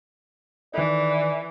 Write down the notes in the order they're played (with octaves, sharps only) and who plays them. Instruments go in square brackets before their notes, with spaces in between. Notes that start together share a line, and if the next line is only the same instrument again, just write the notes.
[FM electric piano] D#3 A4 [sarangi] E3 [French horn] D5